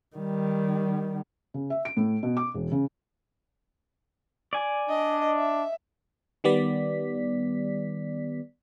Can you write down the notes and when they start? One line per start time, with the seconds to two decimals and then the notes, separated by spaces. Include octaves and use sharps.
0.17 D#3 G3
1.54 C#3
1.70 E5
1.85 D7
1.97 A2
2.23 B2
2.37 D6
2.54 E1
2.72 C#3
4.53 D5 G#5
4.89 D4 D#5
5.37 E5
6.44 D#3 G3 B3 D5 B6